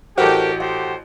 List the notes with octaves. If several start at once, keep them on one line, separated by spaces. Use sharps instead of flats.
A1 F#4 G4 A4 A#4 C5
G4 A4 C5 F#5